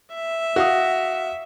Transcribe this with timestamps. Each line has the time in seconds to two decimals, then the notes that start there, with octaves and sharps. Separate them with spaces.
0.14 E5
0.56 F#4 F5 D#6